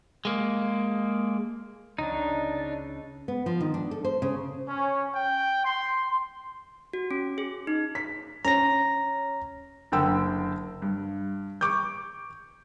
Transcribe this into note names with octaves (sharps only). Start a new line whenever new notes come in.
G#3 A#3
C#2 D4 D#4
B3
F3
D#3
D4
A4
C5
C#3
C#4
G5
C6
F#4
C#4
G#4
D#4
B6
C#4 A#5 A#6
F#1 D3 G5 E6
G2
C#6 D6 G6